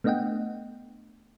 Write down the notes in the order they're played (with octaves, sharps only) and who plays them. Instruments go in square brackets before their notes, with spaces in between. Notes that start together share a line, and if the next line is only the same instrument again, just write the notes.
[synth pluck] A3 B3 D4 D#5 F#5 G5